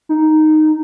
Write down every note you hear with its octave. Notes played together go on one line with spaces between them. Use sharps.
D#4